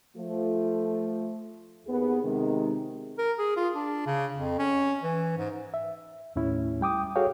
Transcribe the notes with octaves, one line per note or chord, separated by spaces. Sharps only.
F3 A3
D#2 B3 G#4
C3 D#3 G#3
A#4
G#4
F4
D4
C#3
F2
C#4
E3
G#2
E5
D#2 A2 C#4 E4
G3 G5 D6 D#6
F#4 G#4 A4 C#5 F5 G5